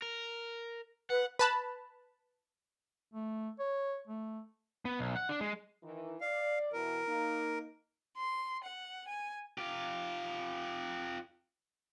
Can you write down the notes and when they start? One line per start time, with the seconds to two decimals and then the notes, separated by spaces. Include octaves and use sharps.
0.02 A#4
1.10 B4 F#5
1.39 B4 A5 B5
3.13 A3
3.59 C#5
4.08 A3
4.85 B3
4.99 B1
5.16 F#5
5.29 D4
5.41 G#3
5.83 D#3 E3
6.21 D5 F5
6.73 B2 E3 A#4
7.06 A#3 D#4
8.17 C6
8.63 F#5
9.08 G#5
9.58 F4 G4